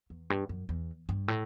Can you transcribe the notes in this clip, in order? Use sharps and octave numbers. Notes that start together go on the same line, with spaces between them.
E2
G2
F#2
E2
G2
A2